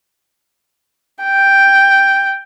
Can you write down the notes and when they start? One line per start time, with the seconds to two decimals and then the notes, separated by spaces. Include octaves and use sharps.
1.23 G5